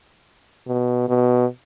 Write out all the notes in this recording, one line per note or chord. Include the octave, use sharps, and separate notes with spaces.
B2
B2